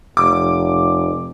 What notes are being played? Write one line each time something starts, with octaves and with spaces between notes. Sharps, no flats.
F1 D6